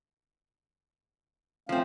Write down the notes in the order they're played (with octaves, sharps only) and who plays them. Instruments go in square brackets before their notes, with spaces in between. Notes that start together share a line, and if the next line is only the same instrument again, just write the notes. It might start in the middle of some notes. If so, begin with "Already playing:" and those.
[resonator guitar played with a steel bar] F3 C4 [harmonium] A3 C#4 F5